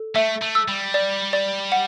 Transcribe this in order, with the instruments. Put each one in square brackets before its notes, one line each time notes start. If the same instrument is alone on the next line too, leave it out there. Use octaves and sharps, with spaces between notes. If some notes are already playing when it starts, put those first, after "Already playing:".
Already playing: [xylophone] A4
[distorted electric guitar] A3 [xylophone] E5
[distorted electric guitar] A3
[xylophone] E6
[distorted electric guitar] G3
[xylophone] D5
D5
F#5